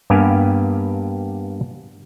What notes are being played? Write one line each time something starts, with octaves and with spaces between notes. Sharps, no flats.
G2 A#3 B3 G4 F5 G#5